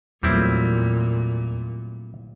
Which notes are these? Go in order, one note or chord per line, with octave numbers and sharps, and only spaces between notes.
E2 A#2 F#3 G3 A3 C4 E4